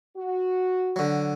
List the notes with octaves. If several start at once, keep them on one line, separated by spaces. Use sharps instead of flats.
F#4
D3 F#3